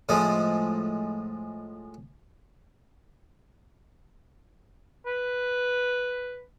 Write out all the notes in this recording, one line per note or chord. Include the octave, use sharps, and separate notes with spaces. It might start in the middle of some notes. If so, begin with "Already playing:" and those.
A2 F3 G#3
B4